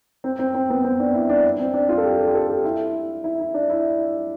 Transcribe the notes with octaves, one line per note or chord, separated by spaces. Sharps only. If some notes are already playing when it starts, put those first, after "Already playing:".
C4
C4
C4
B3
C4
D4
E4
D4
D4
C4
D4
F4
A4
G4
A4
G4
A4
G4
E4
E4
E4
D4
E4